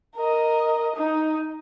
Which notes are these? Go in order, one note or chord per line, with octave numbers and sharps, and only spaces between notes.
A#4 D#5
D#4